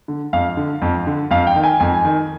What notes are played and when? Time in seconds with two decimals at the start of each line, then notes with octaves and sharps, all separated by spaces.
0.08 D3
0.33 F2 F5
0.57 D3
0.82 F2
1.07 D3
1.31 F2 F5
1.47 G5
1.56 D#3
1.64 G#5
1.80 F2 G#5
2.05 D#3